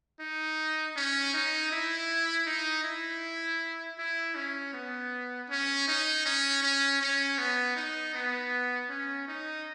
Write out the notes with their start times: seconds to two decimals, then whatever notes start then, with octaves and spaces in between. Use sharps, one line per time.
0.20 D#4
0.96 C#4
1.34 D#4
1.72 E4
2.46 D#4
2.84 E4
3.98 E4
4.35 C#4
4.73 B3
5.49 C#4
5.88 D#4
6.26 C#4
6.62 C#4
7.01 C#4
7.38 B3
7.76 D#4
8.14 B3
8.90 C#4
9.28 D#4